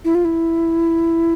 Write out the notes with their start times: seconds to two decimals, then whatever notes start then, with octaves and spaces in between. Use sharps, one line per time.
0.05 E4
0.15 F4
0.25 E4